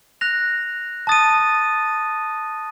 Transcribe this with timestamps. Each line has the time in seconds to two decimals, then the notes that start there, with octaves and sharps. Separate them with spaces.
0.21 F#6 A#6 F7
1.07 A5 D#6 A6 D#7